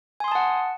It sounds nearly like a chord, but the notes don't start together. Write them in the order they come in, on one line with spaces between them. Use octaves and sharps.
G#5 C6 D#6 A5 F#5